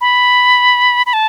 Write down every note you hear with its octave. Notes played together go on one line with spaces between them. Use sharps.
B5
B5
A5